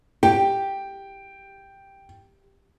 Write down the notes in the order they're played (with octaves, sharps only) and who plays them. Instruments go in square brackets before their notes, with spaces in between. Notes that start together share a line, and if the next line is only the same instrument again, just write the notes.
[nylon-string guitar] G4 [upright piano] G5